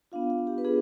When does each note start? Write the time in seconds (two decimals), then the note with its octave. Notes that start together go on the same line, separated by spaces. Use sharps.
0.12 B3 D4 F4 F5
0.30 F5
0.47 G4
0.58 B4
0.65 B3 D4 F4 G#4